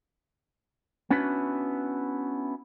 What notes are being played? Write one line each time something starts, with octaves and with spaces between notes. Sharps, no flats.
B3 C#4 D4 E4 F#4 B4